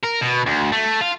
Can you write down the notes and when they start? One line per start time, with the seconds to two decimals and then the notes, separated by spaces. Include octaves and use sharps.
0.04 A#4
0.22 B2
0.47 D2
0.72 A3
1.01 F4